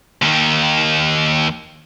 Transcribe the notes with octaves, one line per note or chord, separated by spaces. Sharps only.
D#2 D#3